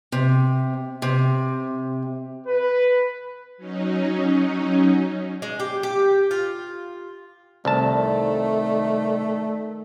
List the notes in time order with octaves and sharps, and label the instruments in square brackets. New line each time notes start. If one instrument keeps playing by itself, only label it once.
[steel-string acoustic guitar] C3
C3
[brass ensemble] B4
[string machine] F#3 C#4 D#4
[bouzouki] G#3
G4
G4
F4
[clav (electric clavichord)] C2 A5 [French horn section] D#3 D5 [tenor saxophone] A3